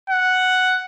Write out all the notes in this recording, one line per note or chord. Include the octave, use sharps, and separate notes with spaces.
F#5